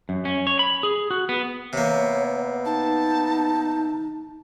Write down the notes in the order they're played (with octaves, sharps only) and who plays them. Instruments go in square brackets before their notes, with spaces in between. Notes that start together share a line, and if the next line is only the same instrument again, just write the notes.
[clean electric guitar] F#2
C#4
C#5
B5
G#4
F#4
B3
[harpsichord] C3 A#3 [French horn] B3 [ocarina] C#5
[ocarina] D#4 [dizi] A5